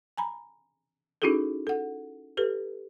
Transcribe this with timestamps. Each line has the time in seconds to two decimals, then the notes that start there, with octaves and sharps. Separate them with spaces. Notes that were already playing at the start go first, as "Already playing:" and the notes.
0.17 G#5 A#5 B5
1.22 C#4 D#4 E4 F#4 G#4 A4
1.67 A4 F#5
2.37 G4 A4 B4